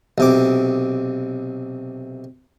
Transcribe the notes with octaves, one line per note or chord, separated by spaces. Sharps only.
B1 C3 D6